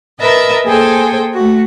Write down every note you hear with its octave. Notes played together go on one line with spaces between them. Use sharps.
A#4 B4 D#5 E5 A5
A#3 G#4 A4 C5 G5 G#5
A3 F#4